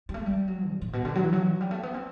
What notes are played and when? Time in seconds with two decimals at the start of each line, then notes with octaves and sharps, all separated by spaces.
0.09 G3
0.14 A3
0.26 G3
0.48 F#3
0.71 B2
0.82 A2
0.93 B2
1.05 D3
1.15 F#3
1.23 E3
1.33 F#3
1.61 G3
1.71 A3
1.83 B3
1.94 C4